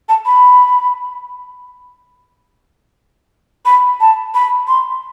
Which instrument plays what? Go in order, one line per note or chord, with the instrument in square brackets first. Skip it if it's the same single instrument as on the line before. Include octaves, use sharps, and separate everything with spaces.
[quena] A5
B5
B5
A5
B5
C6